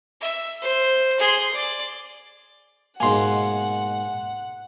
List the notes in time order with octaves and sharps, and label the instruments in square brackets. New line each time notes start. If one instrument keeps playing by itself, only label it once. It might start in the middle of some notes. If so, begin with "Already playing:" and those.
[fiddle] E5
C5
G#4 C6
D5
[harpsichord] G#2 B2 A#3 [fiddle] F#5 [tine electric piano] G#5 C6